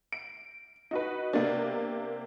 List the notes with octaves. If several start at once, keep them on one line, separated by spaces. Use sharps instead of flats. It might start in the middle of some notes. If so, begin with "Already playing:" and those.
D7
D#4 F#4 B4
C3 A#3 B3 D4 G4